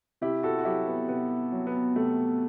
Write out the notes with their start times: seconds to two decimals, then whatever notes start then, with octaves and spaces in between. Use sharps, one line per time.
0.21 C3 E4 G4
0.43 F#4 A4
0.58 F#4
0.65 F#3 E4 G4
0.87 B3
1.08 C3 B3
1.52 F#3
1.67 B3
1.96 C3 A3